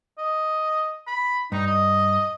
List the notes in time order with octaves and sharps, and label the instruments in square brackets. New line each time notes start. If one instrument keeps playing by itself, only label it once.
[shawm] D#5
B5
[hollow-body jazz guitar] G2 [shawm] D#4
[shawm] D#5